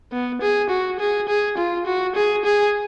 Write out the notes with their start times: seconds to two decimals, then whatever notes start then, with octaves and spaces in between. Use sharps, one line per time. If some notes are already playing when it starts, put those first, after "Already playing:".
0.12 B3
0.41 G#4
0.70 F#4
1.00 G#4
1.28 G#4
1.57 F4
1.86 F#4
2.15 G#4
2.45 G#4